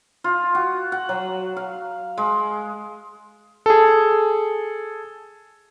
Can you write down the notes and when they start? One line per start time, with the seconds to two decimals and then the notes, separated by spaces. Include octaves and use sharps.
0.24 F4
0.55 F#4
0.92 F#5
1.09 F#3
1.57 F5
2.18 G#3
3.66 G#4 A4